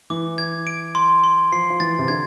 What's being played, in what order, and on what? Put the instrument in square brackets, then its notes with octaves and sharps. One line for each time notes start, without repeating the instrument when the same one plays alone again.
[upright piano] E3 [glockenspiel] D6
[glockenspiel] G#6
D7
C6
C6
[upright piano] F3 [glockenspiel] C7
[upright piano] F3
[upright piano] E3 [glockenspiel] A6
[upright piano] C3
[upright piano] D3 [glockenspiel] G#6